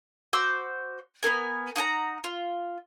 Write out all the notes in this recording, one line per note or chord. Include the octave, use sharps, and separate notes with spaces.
F#4 C5 D6 E6
B3 C4 A#4 G#5
D#4 F#5 A5 A#5
F4